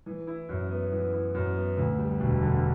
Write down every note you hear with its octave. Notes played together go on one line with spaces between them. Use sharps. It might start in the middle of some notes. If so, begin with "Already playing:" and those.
E3
E4
F#2
B3
E3
E4
F#2
B3
D2
G3
E1
D3